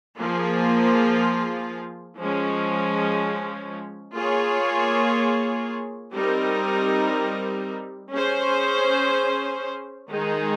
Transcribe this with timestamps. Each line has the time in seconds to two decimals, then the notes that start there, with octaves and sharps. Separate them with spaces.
0.19 F3 A#3 F4 G#4
2.17 F3 G#3 C#4
4.16 A#3 F4 G#4 C#5
6.14 G3 C4 D#4 A#4
8.12 C#4 G#4 C5
10.11 D#3 G#3 D#4 G#4